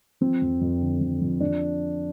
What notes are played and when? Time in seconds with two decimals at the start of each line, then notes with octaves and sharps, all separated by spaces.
0.21 F3 C4
0.41 F2
0.61 F2
0.81 D3
1.01 F2
1.21 F2
1.40 F3 D4